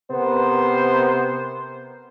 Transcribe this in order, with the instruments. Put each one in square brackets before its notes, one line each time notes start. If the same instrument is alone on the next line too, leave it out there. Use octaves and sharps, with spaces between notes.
[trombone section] C3 B3 A#4 C5